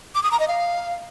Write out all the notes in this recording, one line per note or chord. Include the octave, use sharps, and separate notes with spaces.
D6
D#6
A#5
D#5
F5